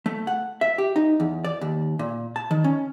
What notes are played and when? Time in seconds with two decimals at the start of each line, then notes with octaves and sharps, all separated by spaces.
0.06 A3
0.27 F#5
0.61 E5
0.78 G4
0.96 D#4
1.20 E2
1.45 D5
1.61 D#2
1.99 A#2
2.36 A5
2.51 D#3
2.64 C#4